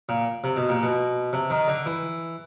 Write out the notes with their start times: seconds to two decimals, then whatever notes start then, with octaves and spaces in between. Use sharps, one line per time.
0.09 A#2
0.44 C3
0.57 B2
0.69 A#2
0.83 B2
1.33 C3
1.50 D#3
1.68 D3
1.86 E3